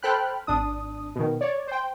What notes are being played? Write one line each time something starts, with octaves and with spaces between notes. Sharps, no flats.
A4 C5 G5 B5 F6 F#6
G#1 D4 D#6
B2 D#3
C#5 D5
C5 G5